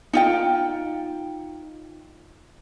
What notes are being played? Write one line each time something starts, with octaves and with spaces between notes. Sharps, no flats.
D#4 F4 G5